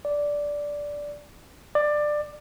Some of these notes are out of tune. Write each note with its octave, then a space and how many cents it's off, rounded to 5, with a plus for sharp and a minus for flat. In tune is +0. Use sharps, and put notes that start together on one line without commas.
D5 -10
D5 +15